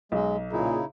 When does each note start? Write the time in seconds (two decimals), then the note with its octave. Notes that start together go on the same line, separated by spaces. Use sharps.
0.12 B1 G#3
0.52 A#2 C#3 D#4 E4 G#4